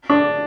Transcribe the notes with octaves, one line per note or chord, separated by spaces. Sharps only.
D4